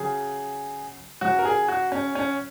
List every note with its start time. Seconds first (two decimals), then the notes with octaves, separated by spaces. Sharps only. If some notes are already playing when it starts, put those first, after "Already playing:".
Already playing: C#3 F#3 G#4
1.21 C#3 F#3 F#4
1.39 A#4
1.45 G#4
1.68 F#4
1.92 C#4
2.15 C#4